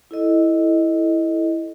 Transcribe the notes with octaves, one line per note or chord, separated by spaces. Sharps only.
E4 A4 D#5